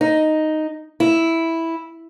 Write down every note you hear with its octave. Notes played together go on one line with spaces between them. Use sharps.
D#4
E4